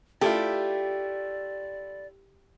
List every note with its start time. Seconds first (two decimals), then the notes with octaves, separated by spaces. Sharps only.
0.21 A3 E4 F4 G4 D5